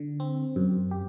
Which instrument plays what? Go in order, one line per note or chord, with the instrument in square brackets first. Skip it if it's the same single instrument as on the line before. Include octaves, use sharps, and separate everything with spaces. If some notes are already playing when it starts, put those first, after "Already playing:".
Already playing: [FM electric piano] D3
C4
F#2
G4